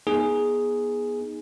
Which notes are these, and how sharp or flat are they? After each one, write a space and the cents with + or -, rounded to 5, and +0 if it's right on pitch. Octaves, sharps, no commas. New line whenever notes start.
B3 -30 D#4 +5 G#4 +0